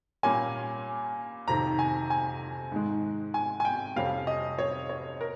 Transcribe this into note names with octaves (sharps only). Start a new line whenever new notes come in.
A#2 G3 A#3 C#4 G#5
F2 C3 D#3 A#5
G#5
G#5
G#2 D#3 G#3
G#5
G#5
G5
F2 C3 G3 C#4 F5
D#5
C#5
C#5
A#4